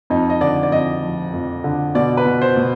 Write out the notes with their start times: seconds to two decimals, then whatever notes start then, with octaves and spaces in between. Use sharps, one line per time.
0.10 F2 D#4
0.30 D#5
0.41 D3 D5
0.63 D5
0.71 F2 D#5
1.02 F3
1.33 F2
1.64 D3
1.95 B2 D5
2.17 B4
2.25 B2
2.42 C5
2.57 B2